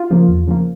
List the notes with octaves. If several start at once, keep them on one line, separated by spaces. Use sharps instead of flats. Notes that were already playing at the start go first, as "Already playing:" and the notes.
Already playing: F4
C#3 F3 A#3
E2
C#3 F3 A#3